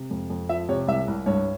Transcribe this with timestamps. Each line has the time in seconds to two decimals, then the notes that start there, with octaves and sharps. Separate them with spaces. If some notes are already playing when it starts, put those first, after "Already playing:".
Already playing: C3
0.10 F2
0.30 F2
0.49 F3 E5
0.69 C3 C#5
0.87 C2 E5
1.08 C2
1.26 G2 C#5